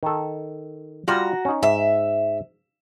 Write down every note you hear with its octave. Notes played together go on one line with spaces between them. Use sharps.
D#3 A4
G3 F4 F#4 A#5
C#4 D#4
G#2 E5